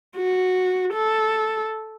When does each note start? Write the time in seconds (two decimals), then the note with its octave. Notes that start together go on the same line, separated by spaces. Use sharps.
0.17 F#4
0.93 A4